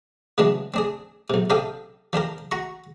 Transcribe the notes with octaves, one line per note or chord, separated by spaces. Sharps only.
C#3 E3 F#3 G#3 D4
C4 D4 G#4
B1 C3
C3 D4 A4 F5 G5 D#6
F3 D4 G4 A#4
F#4 A#5 C#6